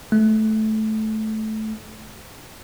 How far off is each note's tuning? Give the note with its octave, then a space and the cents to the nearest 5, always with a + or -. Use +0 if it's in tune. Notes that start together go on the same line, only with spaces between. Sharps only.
A3 -15